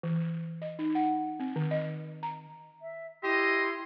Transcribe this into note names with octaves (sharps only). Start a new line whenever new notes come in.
E3
D#5
D#4
F#5
C4
D#3
D#5
A#5
E5
E4 G4 D#5 C6